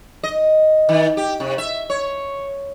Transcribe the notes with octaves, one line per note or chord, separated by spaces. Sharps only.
D#5
D#3
G4
C3
E5
C#5